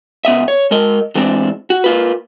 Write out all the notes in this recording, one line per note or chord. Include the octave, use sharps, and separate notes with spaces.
C#2 B3 D#5 E5
C#5
G#3 A#4 D#5
E3 G#3 C4 D4
F#4
A#3 F4 B4